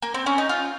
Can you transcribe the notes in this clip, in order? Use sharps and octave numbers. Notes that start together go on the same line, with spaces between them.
A#3
C4
C#4
D#4
F4